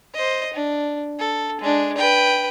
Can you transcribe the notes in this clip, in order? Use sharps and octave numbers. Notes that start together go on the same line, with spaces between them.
C5 D#5
D4
A4
G#3 D4
B4 G5